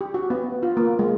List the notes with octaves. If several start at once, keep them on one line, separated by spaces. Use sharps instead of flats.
G4
F#4
B3
F4
A#3
G#3